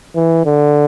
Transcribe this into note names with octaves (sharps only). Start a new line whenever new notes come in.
E3
D3